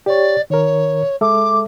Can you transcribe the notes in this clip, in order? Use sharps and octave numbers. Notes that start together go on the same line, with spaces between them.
G4 C#5 D5
D#3 A#4 C#5
G#3 A4 E5 D6